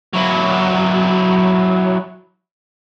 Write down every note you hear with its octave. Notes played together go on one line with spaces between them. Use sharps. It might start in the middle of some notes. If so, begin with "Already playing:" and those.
F#3 E4